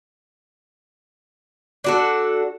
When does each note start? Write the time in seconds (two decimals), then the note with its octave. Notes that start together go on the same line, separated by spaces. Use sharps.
1.84 D4 F#4 A4